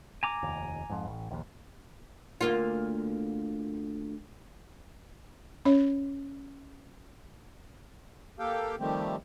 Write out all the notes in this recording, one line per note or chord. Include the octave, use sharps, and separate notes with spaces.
G#5 A#5 D6
F1 D#2
F2 G#2
A1
A#1 D#2
D2 A#3 F4
C#4 C#5
A#3 G4 A4 F5 G5
D#3 F3 G3 A3 C4 G4